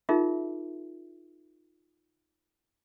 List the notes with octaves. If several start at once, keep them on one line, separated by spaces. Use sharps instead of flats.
D#4 F4 G#4 A#4 E5